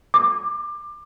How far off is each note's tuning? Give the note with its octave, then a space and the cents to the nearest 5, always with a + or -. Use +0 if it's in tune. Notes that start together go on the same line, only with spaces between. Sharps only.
D6 +25